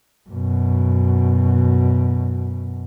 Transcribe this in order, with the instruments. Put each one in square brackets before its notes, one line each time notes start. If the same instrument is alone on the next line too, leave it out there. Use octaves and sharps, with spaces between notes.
[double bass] F#2 B2